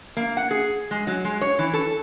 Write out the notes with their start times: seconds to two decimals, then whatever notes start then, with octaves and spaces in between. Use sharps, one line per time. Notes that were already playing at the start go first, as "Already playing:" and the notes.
0.17 A#3
0.37 F#5
0.51 G#4
0.91 G#3
1.07 F#3
1.25 G#3
1.41 C#5
1.59 E3
1.74 A4